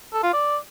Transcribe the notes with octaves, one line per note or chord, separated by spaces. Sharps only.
A4
F4
D5